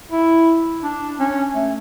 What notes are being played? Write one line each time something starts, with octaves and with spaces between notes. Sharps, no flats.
E4
D4
C#4
A3